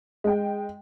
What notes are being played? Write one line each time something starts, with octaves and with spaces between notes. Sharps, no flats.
G#3 G5